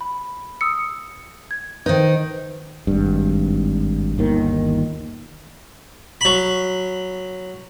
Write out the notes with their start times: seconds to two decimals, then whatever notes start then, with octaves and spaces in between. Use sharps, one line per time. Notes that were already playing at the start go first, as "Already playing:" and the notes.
0.01 B5
0.61 D#6 E6 C#7
1.51 G#6
1.86 D#3 D#4 B4 C5
2.87 G#1 G2
4.18 G1 D#2 D#3
6.21 F#3 B5